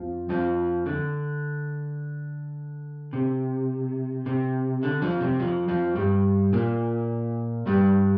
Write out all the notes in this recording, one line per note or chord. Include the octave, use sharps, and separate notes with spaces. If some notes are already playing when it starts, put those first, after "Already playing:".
Already playing: F2 F3
F2 F3
D3
C3
C3
D3
F2 F3
C3
F2 F3
F2 F3
G2 G3
A#2 A#3
G2 G3